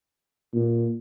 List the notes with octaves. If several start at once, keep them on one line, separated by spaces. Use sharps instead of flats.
A#2